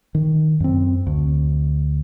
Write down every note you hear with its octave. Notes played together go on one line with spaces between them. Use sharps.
D#3
F#2 C4
D2